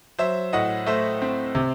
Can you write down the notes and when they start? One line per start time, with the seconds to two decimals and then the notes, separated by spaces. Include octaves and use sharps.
0.19 F#3 C5 E5
0.53 A2 D#5 F#5
0.86 A3 C5 E5
1.22 C4
1.55 C3